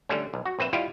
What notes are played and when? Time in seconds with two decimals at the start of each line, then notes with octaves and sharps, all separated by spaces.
0.09 D3 G3 A3 C#4
0.34 B1
0.46 F#4
0.59 A#1 C4 B4 E5
0.73 G3 E4 F4 G4 D#5 F5